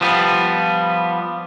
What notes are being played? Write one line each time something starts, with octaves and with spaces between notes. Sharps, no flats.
F3 G3 B3